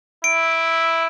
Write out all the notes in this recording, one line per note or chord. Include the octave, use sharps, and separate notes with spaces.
E4 D7